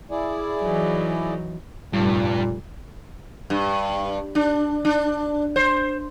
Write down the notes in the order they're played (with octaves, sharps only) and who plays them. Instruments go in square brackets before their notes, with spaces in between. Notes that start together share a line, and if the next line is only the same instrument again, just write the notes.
[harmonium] E4 G#4 D5
[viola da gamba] E3 F#3 D#4
[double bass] F1 G3 [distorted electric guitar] G2 [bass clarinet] A#2
[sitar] G2
D4
D4
C5